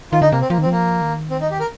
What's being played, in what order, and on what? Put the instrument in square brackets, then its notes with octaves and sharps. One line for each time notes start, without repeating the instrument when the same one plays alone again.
[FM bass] D#3 [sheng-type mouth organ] F4
[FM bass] D3 [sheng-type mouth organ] D#4
[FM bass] C3 [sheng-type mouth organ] A#3
[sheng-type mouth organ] C4
[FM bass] F3 [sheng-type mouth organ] A#3
[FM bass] D#3
[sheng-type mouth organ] C4
[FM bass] F3
[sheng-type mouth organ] A#3
[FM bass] D#3
[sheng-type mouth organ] C4
D#4
G4
A#4